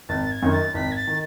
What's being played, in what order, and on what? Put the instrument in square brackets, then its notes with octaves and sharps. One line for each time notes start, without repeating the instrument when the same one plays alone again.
[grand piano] G#1 [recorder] A6
[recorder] G#6
[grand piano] F#2 D#3
[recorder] A6
[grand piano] G#1 [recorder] B6
[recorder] G#6
A6
[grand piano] D#3